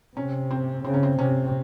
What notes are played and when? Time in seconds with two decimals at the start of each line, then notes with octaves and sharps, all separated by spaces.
0.17 C3 C#4
0.51 C4
0.84 C#3 C4
0.94 C#4
1.03 C4
1.18 C3 C#4